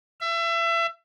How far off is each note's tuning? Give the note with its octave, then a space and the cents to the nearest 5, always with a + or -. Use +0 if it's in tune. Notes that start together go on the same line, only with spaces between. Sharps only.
E5 +30